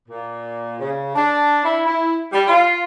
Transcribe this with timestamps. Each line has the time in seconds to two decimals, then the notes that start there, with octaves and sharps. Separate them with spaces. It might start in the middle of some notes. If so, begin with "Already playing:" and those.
0.08 A#2
0.80 C#3
1.15 D4
1.64 E4
1.85 E4
2.32 G3
2.48 F4